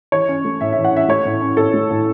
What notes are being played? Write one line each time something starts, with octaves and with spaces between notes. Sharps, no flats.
E3 C#5
C#4
A3
A2 E5
E5
E3
F#5
C#4 E5
A3 C#5
A2
C#4
A2 A4
A3
A2